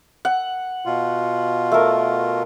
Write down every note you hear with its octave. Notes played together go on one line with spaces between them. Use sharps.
F#5
B2 F4
A3 A#4